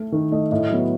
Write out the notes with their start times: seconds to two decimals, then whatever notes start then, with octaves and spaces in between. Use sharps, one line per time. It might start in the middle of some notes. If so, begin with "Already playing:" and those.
Already playing: A3
0.12 D#3
0.32 A3 D#5
0.51 A2 D#5
0.70 F#3 B3